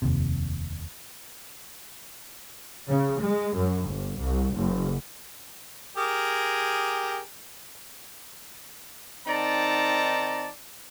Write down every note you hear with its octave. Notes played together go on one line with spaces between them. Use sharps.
F1 D#2 C3
C#3
G#3
F#2
G1
C2
F#1
G4 G#4 A#4
D#3 C4 D#4 D5 A5 A#5